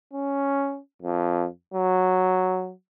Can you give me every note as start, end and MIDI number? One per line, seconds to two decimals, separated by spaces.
0.13 0.79 61
1.02 1.47 41
1.74 2.72 54